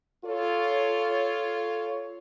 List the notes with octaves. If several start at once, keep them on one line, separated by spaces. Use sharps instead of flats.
F4 A4 C#5